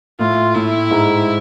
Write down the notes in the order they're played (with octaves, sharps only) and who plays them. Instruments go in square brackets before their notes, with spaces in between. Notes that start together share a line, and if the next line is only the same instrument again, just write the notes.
[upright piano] A2 A3 [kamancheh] F4
[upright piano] A2 A3 [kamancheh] E4
[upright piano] G#2 G#3